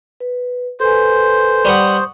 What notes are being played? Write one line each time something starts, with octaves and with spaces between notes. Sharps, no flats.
B4
A4 B4 C5 G#5
G3 B4 F#5 C#6 D#6